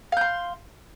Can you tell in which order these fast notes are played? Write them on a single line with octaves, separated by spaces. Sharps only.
F5 G6 C6